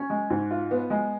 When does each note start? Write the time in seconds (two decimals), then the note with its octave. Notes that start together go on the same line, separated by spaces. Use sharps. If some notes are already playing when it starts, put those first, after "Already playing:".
Already playing: C#4
0.10 G#3
0.30 G#2
0.51 F4
0.71 B3
0.90 G#3